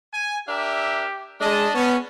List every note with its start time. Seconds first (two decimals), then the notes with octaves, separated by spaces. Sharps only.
0.13 G#5
0.48 D4 G4 A#4 E5
1.41 G#3 D4 D#5 A5
1.75 B3 C#4